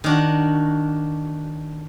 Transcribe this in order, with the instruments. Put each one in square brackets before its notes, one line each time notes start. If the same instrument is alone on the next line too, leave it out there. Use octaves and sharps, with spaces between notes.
[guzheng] D#3 D4 F#4